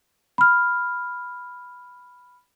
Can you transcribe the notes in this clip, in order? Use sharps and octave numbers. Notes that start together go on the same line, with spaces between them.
B5 F6